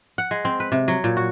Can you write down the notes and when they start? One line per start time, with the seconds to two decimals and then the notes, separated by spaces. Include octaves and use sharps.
0.18 F#5
0.31 G#3
0.45 C4
0.60 B4
0.72 C3
0.88 F#3
1.04 A#2
1.17 F#4